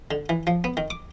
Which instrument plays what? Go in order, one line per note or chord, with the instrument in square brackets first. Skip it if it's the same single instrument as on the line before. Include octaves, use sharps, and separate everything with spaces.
[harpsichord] D3
E3
F3
B3
D#3
D6